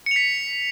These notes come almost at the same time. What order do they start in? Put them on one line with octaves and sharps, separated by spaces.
C#7 F7 B6